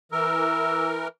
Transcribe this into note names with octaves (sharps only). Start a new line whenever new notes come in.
E3 A#4 E6